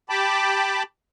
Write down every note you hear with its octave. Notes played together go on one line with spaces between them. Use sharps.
G4 G5 A5 B5 D6